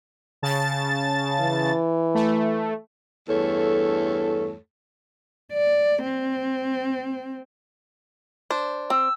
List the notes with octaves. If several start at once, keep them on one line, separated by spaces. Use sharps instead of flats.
C#3 A5 A6
E3
A3
E2 G2 A3 A4 C#5
D5
C4
D4 C5
C4 E6